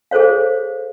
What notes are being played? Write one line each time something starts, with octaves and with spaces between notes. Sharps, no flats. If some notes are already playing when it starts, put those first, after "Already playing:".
G#4 A4 C5 C#5 F5